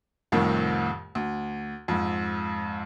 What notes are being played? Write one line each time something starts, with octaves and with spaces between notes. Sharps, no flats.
C2 F2 A2 D#3
D2
F2 G#2